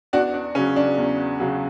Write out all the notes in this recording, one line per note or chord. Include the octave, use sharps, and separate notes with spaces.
E2 D4 F#4
D4
C#3 F#3 C#4
D4
E2
C#3 F#3